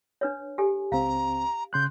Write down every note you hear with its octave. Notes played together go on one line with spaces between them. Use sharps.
D4 B4 C#5
G4 A4 G#5
C#2 C4 F5 A#5
C#3 C6 F#6 G6